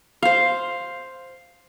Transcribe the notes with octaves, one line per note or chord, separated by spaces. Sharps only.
C5 F5